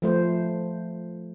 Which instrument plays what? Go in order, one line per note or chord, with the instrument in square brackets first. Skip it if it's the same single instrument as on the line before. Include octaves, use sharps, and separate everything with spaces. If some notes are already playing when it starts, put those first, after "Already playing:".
[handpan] F3 A3 C5